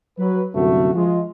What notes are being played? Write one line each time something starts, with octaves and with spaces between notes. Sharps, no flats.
F#3 B4
C2 F#2 D3 A3 F#4
F3 G#3 F4